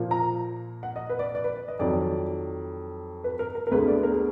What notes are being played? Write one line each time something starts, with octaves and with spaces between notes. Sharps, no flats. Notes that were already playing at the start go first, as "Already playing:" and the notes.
Already playing: A#2 F3 A#3
A#5
F#5
D#5
B4
D5
D5
B4
D#5
F2 D#3 F#3 D5
B4
A#4
A#4
A#4
D2 D3 G#3 B3 B4
D5
A#4
G#4